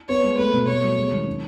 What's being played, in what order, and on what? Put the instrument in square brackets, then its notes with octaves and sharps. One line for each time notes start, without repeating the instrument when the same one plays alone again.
[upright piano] B3 [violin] C#5
[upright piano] G#3
[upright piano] A3 [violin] B4
[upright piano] B2
[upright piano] A3 [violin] C#5
[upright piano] F#3
G#3
D#3
C#4